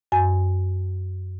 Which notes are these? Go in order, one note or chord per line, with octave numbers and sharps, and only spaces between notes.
F#2 G#5